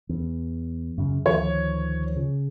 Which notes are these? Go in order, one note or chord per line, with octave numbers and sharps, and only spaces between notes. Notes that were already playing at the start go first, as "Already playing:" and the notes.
E2
F#2 C#3
D2 D#3 F3 C#5
C#3